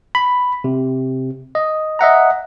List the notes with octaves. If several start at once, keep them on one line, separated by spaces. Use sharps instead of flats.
B5
C3
D#5
D#5 E5 F#5 A#5